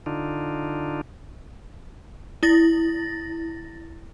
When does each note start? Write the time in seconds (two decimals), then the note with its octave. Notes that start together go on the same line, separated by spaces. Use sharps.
0.06 D3 D4 D#4 F4
2.43 E4 A6 A#6